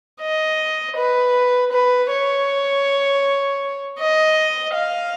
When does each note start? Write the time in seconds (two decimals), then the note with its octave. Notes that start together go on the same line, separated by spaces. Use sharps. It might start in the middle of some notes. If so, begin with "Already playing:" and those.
0.21 D#5
0.96 B4
1.72 B4
2.10 C#5
3.99 D#5
4.74 F5